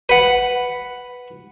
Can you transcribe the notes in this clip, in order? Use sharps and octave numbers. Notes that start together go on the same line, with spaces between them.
B4 F#5